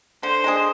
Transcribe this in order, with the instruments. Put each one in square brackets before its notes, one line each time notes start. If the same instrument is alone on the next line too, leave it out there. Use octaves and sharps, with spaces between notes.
[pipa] D3 [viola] C5
[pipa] G#3 D4 G#4